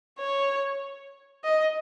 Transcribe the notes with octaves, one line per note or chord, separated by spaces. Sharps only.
C#5
D#5